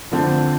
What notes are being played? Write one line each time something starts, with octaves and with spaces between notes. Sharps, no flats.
F2 D3 A3 C4